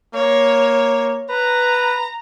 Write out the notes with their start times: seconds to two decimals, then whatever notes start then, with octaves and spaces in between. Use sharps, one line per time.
0.14 A#3 C#5
1.30 B4 A#5